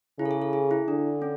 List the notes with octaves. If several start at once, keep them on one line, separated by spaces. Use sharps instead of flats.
C#3 E4
A4
G#4
A4
G#4
E4
D3 D4
C#4